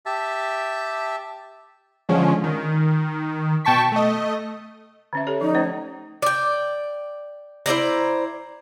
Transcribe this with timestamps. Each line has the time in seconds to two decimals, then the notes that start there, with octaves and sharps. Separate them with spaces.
0.06 G4 E5 A5
2.09 D3 F3 G#3 C#4
2.44 D#3
3.65 B2 G5 A5 C#6 B6
3.92 A3 D#5
5.13 D3 C#4 E5
5.27 G4 A4 C#5
5.41 F3 D#4
5.55 A3 C#4 C5
6.22 D5 G5
7.66 E4 C5 D5 A#5